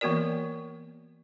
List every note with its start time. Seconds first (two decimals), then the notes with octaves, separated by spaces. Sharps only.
0.01 E3 A#3 B3 F#4 A#4 D5